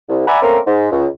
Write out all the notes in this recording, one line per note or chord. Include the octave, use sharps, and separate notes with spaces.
C2
D5 E5 F#5 G#5 A#5 B5
A3 A#3 C4 C#4 A#4
G#2
C#2